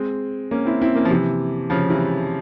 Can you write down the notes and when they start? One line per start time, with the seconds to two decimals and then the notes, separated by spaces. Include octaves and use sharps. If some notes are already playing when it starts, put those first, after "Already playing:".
Already playing: G#3 C4
0.51 A#3 C#4
0.65 C4 E4
0.82 C4 E4
0.95 A#3 C#4
1.05 F3
1.10 C3 E3
1.70 C#3 F3
1.90 C3 E3